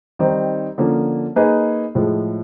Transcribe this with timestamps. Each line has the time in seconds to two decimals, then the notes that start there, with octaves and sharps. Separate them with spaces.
0.19 D#3 G3 C4 D#4
0.78 D3 F3 A#3 C#4
1.36 A#3 D#4 G#4 B4
1.95 A2 F3 G#3